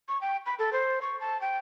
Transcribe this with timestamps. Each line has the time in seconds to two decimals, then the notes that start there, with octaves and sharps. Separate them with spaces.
0.08 C#6
0.21 G5
0.46 B5
0.59 A4
0.73 C5
1.02 C#6
1.21 A5
1.41 G5